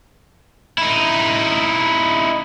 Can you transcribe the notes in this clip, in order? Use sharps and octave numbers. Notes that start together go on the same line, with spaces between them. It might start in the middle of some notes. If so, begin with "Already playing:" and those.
D#4 E4